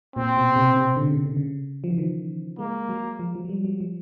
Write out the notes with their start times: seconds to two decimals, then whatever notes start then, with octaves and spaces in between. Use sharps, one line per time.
0.16 A#2 C4
0.37 B2
0.56 C3
0.76 C3
0.97 D3
1.08 C#3
1.25 D3
1.37 C#3
1.84 F3
1.90 E3
1.98 D#3
2.59 G#3 A#3
2.89 F#3
3.19 F3
3.35 F3
3.45 F#3
3.49 G3
3.65 F#3
3.81 F3